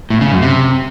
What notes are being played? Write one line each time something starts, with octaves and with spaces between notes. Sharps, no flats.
A2
C#3
F#2
C3